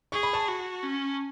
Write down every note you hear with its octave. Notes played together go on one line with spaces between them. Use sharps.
G#4 C#6
B5
A5 C#6
F#4
C#4